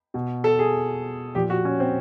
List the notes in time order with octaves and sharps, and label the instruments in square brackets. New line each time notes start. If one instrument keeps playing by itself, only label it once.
[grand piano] B2
A4
G#4
A#2 F3 G4
F#4
C#4
C4